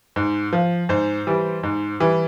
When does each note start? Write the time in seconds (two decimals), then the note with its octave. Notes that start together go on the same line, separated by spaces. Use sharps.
0.16 G#2
0.53 F3
0.89 G#2 C5
1.27 E3 G3
1.63 G#2
2.00 E3 G3